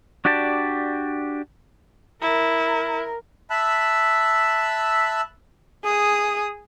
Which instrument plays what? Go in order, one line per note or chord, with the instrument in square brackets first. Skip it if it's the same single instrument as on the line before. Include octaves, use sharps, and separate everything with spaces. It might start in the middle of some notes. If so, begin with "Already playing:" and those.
[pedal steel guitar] D4 F#4 G4 D5 A5
[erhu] E4 [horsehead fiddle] A#4
[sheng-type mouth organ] E5 A5 B5 E6 F#6
[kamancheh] G#4 D#6